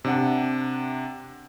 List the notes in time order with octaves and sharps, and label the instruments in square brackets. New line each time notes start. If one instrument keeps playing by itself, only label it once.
[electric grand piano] C3 D4 F#5